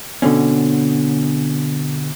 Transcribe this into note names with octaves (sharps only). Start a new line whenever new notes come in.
B2 D3 C4 C#4